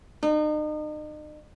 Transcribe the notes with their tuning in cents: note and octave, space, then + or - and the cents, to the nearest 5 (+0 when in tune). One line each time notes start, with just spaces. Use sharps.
D#4 -40